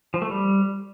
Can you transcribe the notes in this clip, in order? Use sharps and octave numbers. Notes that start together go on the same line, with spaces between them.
F3
A3
G3